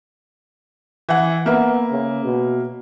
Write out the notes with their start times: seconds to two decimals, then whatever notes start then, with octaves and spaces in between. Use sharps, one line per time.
1.09 E3 F#5
1.46 A#3 B3 E5
1.91 C#3
2.25 B2